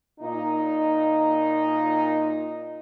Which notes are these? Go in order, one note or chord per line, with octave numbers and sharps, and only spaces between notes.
A#2 D#4